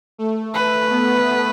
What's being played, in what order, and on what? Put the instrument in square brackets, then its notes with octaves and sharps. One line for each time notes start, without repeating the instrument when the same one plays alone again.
[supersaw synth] A3
[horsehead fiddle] B4
[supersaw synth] B3